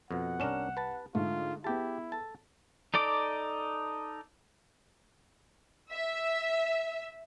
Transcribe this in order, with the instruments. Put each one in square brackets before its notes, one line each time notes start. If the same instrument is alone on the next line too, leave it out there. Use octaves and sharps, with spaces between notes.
[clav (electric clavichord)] F2 B2 [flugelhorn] F#5
[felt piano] C2 E7 [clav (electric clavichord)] C#4 D4 A#4
[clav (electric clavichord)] B4 A5
[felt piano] G#2 D3 [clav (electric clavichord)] A3 [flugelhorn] F4
[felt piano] B3 G#4 [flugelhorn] E4 [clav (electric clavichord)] G4 A5
[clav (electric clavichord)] A4 A5
[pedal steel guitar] D#4 A4 D5 D6
[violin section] E5